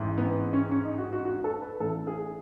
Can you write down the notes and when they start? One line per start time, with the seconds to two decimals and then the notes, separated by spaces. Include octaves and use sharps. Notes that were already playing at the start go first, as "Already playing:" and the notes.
Already playing: A1 G#2 E3
0.18 B3
0.53 C#4
0.71 C#4
0.85 D#4
0.98 F#4
1.13 F#4
1.25 F#4
1.44 A4
1.61 B4
1.80 A1 A2 E3 A4
2.07 G#4